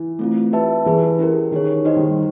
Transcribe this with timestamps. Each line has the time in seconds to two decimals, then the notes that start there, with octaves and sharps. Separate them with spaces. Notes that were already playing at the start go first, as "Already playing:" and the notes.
Already playing: E3
0.19 A3 C4 F4
0.53 G4 B4 E5 A5
0.86 E3 E4 G#4 B4
1.19 C#4 E4 G4 A#4
1.52 D#3 D#4 G#4 C#5
1.85 D#4 G4 C5 D#5
1.97 D#3
2.08 G3